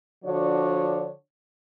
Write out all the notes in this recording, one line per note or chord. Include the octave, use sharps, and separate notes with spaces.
D3 F3 D4 F#4 C#5